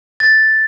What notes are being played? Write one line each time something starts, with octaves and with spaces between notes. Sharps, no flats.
A6